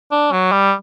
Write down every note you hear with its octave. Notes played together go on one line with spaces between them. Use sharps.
D4
F#3
G3